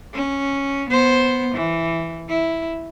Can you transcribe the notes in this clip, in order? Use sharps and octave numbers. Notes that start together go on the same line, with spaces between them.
C#4
B3 C5
E3
E4